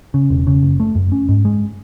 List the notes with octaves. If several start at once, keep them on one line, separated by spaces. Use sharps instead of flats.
C#3
E1
C#3
F#1
A3
F#2
C#4
G#2
G#3